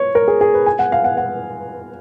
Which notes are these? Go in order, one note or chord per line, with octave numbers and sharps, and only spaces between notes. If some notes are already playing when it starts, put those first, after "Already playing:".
Already playing: C#5
A#4
G#4
G#4
B4
G#5
F#5
F5
F#5
F#5